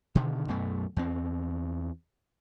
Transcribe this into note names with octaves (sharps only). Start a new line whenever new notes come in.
B2 D3 D#3
B1 F#2 B2 A3
E2 C4